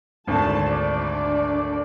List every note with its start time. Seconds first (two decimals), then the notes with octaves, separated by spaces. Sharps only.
0.27 G#1 D2 A5
0.67 D4 D5